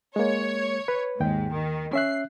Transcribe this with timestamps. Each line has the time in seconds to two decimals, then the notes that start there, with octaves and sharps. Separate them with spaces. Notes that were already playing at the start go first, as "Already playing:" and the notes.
0.16 G#3 A#3 C#5
0.88 B4
1.20 D#2 G#2 G5
1.54 D#3
1.93 C#4 E5 F#6 C7